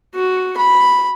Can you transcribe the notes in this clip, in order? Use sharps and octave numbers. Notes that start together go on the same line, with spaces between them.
F#4
B5